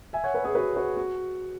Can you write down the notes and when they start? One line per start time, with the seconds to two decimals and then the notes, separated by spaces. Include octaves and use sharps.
0.13 E5 G#5
0.24 C#5 F#5
0.34 B4 E5
0.44 G#4 C#5
0.55 F#4 B4
0.76 F#4 B4
0.96 F#4